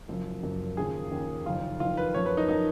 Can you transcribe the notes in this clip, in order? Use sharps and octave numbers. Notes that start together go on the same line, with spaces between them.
F#1 F#2 F3 A#3
F#1 F#2 F3 A#3
D#2 C#3 F3 A#3 G#4
D#2 C#3 F3 A#3
F#1 F2 D#3 F4
F#1 F2 D#3 F4
B4
F#2 F3 A#3 C#5
B4
D#4
F3 A#3 D#4